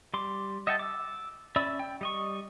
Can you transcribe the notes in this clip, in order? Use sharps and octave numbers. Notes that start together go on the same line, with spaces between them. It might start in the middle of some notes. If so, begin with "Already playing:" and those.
G3 C6 D6
D#5 E5 F#5 G5 A5
D6 E6
C#4 D5 E5 B5 E6
G5
G3 D#5 C#6